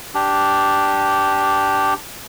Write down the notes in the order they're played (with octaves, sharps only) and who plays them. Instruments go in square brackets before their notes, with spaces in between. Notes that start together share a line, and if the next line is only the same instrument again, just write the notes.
[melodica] D4 G4